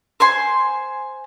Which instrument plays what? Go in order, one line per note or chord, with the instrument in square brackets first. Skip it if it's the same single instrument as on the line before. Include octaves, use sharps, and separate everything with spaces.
[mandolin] C5 G#5 C6